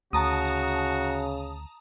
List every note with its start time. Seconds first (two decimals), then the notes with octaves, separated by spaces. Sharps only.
0.13 D2 C#3 F#4 A5 A#5 D#6